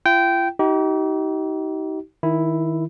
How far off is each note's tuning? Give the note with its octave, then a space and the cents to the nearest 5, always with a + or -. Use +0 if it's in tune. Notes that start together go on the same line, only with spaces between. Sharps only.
F4 -45 G5 -15
D#4 +30 G4 -35
D#3 +20 E4 +0